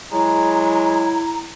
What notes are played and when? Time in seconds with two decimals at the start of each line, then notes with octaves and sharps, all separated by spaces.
0.12 F#3 G#3 E4 A#5